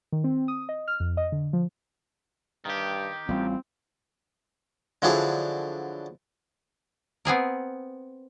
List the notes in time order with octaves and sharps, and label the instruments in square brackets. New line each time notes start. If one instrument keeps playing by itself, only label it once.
[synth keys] D#3
C4
D#6
D#5
F6
F2
D#5
D3
F3
[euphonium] G2 [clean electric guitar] D#3 G4
[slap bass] A1 G3 A3 [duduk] C4 [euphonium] F4
[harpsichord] D3 F3 F#3 D4 E4 G#4
[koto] B3 C4 G#4 A#4